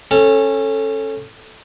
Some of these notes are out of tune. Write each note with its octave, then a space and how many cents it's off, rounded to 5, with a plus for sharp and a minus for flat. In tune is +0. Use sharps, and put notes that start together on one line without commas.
C#4 -20 A4 +0